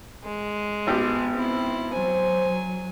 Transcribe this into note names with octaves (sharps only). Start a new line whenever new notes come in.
G#3
G#1 B3 G4
C4 E4
F#3 C5 G#5